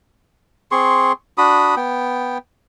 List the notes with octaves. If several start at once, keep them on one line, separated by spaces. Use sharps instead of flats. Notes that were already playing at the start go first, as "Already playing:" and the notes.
C4 G#4 C6 C#6
D4 F#4 B5 D#6
B3 G5